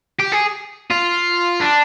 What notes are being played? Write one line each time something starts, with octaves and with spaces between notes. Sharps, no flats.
G4
G#4
F4
D4